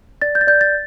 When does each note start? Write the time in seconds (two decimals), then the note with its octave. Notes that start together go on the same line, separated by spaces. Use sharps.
0.22 D5 A6
0.35 G6
0.41 A6
0.47 D5 G6
0.61 A6